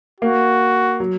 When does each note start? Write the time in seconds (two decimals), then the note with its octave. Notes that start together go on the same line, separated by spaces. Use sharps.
0.21 A#3 F#4
1.00 F#3